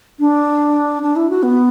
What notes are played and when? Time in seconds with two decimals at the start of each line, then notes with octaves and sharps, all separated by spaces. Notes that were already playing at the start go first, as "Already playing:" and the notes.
0.20 D4
1.03 D4
1.16 E4
1.30 F#4
1.43 B3